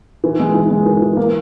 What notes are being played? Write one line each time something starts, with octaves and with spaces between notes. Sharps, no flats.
E3
G#3
E3
G#3
E3
E3
A#3